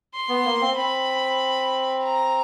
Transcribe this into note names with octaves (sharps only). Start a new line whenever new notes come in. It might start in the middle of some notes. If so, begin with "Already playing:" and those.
C6
B3
A#3
C4
C4 B5
A#5